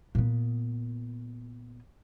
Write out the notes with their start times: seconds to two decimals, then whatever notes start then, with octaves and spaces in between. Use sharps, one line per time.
0.15 A#2 B3